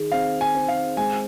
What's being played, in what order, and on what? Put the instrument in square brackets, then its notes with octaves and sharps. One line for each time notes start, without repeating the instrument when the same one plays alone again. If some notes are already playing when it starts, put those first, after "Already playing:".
Already playing: [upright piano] D#3 G#4
[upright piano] C4 [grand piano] F5
[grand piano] G#5
[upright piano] C4
[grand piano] F5
[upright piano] G#3 [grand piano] G#5